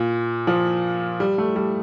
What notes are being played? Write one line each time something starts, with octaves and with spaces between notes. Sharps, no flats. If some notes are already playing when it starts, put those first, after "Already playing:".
Already playing: A#2
F3
G3
A3
G3